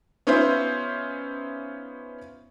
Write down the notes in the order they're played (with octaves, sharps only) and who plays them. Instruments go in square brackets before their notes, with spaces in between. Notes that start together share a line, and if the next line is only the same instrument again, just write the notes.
[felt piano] B3 C#4 D#4 F4 C5 E5